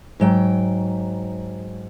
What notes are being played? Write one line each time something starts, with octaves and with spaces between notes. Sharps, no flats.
G#2 F#3 G5